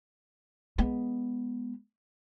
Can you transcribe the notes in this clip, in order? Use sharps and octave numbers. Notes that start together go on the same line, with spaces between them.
G#3 B3